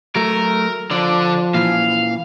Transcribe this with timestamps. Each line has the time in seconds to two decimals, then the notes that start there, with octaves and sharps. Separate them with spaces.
0.16 F#3 A3 A#4
0.91 D3 F3 D4 D5
1.54 A#2 E3 F5